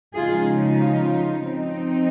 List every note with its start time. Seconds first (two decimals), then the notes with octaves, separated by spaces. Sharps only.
0.15 C#3 F3 G#3 D#4 F4 G#4
0.79 F4
1.45 F3 C4 D#4